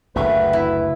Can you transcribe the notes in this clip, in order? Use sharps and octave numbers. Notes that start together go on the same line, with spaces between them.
F#1 D2 A3 B4 E5
E4